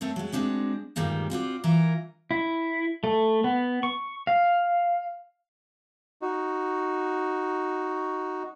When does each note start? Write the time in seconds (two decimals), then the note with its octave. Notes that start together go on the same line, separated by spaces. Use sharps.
0.01 A3 C4 A#4 C#5
0.16 F#3 G#3
0.32 G#3 C4 D4 F#4
0.96 D2 G2 A#2 D#3 G3 G#3
1.30 C4 F4 F#4 D5
1.64 E3 F4 A#4
2.31 E4
3.04 A3
3.44 B3
3.83 C#6
4.27 F5
6.22 D#4 F#4